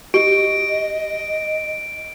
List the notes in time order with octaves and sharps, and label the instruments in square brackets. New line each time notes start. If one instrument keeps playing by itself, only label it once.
[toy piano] G4 [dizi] D#5 [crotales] D7